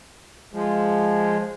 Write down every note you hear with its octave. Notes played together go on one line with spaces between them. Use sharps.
F3 G#3